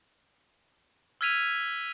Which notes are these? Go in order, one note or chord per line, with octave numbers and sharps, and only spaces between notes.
E6 F6 G#6 B6 D#7 F7